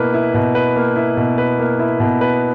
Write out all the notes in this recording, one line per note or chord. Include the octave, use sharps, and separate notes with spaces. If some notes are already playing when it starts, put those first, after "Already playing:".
Already playing: B2 A#3 E4 B4
E4
B2
B4
A#3
E4
B2
B4
A#3
E4
B2
B4